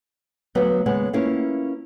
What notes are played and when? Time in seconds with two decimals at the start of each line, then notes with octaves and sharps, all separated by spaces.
0.55 D2 F#3 B3 B4 C#5 F5
0.86 D#2 C#3 G#3 B3 C#5 F#5
1.13 A#3 C#4 E4 F4 B4 F5